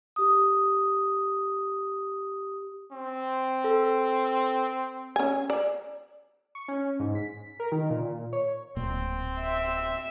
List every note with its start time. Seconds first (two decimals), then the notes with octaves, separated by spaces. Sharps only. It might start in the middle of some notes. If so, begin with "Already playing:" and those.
0.16 G4 D#6
2.92 C4
3.64 A4
5.16 C#4 G#5
5.50 D5
6.55 C#6
6.68 C#4
7.00 G#2
7.15 B6
7.60 A#4
7.72 D#3
7.90 A#2
8.33 C#5
8.76 D1 A#2 C4
9.40 E5